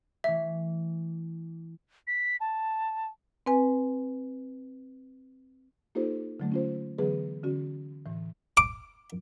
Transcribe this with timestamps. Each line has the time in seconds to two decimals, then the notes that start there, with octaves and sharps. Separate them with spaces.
0.24 E3 A3 E5
2.07 B6
2.40 A5
3.46 C4 B4 G#5
5.95 A#3 D#4 F4 G4 A4 C5
6.40 D3 F#3 A3
6.52 C#4 F4 C5
6.98 D3 E3 F#3 B3 G#4 B4
7.43 D3 C#4 F#4
8.06 A2 E3
8.57 D6